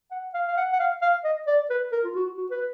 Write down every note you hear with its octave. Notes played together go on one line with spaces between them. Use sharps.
F#5
F5
F5
F#5
F#5
F5
F5
D#5
D5
B4
A#4
F4
F#4
F#4
B4